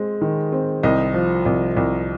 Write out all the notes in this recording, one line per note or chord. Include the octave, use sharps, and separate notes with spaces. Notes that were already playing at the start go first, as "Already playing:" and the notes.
Already playing: G#3 C4
D#3
C4
C2 D#5
F3
C2
C2